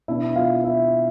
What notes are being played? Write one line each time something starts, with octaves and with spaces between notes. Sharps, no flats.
B2 B3 D4 E4 E5
F4 F5
E4 E5